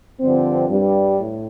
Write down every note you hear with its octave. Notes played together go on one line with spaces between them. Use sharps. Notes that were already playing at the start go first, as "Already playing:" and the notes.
G2 D3 F3 C4
G2 G3
A2